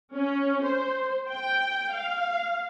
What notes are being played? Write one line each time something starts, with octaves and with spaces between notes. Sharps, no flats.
C#4
C5
G5
F5